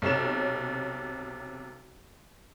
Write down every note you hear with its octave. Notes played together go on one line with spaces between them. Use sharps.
B1 C3 C#4 E7